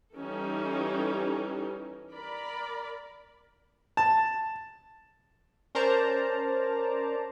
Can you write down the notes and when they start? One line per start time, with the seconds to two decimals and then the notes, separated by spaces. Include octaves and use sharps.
0.15 E3 G3 C#4 D#4 A4
2.12 A#4 D5 B5
3.97 A5
5.75 C#4 A#4 C5 D5 A5 A#5